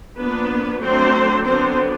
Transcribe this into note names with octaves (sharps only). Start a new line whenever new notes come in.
F3 A#3 B3 D4 B4
F#3 A3 C4 D4 C5
D3 F#3 B3 C4 D4 C5